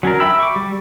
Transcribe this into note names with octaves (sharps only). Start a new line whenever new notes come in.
F#3 C#4 D4 A#4
E5 G5 B5 E6
C#6 D6
G3